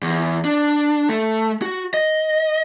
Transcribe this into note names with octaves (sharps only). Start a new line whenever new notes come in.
E2
D4
A3
F#4
D#5